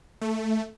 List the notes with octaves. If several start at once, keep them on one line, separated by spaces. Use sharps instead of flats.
A3